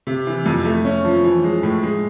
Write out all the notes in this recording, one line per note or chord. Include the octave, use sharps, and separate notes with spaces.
C3
E3
F2
A3
C#4
F3
E3
G#3
A2
G#3